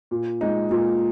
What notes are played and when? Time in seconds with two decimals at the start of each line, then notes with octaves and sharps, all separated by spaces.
0.11 A#2
0.41 G#3 D#4
0.71 A#2